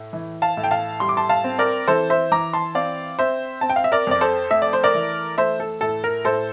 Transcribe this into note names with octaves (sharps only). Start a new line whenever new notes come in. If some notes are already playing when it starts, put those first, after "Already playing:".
Already playing: A2
E3
F5 A5
A2
G5
F5 A5
G3 C6
D6
A5 C6
F5 A5
C4
A#4 D5
E3 A4 C5
C5 E5
E3 A#5 D6
A5 C6
C4 D5 F5
C4 C5 E5
C4 A5
G5
F5
E5
A#4 D5
F2 D5
A4 C5
A3 E5
D5
C5
A#4 D5
E3
A3 C5 E5
A4
A2 A4
A#4
A2 A4 C5